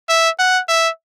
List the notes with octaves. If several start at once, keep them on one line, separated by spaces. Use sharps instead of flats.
E5
F#5
E5